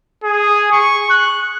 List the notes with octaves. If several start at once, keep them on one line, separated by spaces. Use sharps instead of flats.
G#4
C#6
F#6